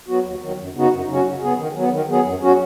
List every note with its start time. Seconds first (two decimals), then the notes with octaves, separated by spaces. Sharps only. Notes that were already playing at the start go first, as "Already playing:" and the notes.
0.08 F#3 B3 F#4
0.25 D#2
0.42 D#3 F#3
0.59 F#2
0.75 C#3 B3 D#4 F#4
0.92 F#2
1.09 C#3 F#3 C#4 F#4
1.25 C#3
1.42 B3 G#4
1.58 D#3
1.75 F#3 B3
1.92 D#3
2.09 F#3 B3 G#4
2.25 F#2
2.42 F#3 C#4 F#4